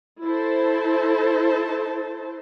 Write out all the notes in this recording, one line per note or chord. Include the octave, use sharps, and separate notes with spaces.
E4 A4 C5 A5